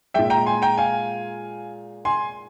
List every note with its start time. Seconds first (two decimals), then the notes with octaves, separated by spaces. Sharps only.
0.14 A#2 G#3 E5 G5
0.30 G5 A#5
0.46 G#5 C6
0.62 G5 A#5
0.77 F5 G#5
2.05 G#5 C6